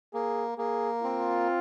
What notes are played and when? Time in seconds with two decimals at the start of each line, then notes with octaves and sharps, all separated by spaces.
0.14 A#3 G#4
0.58 A#3 G#4
1.03 C4 F4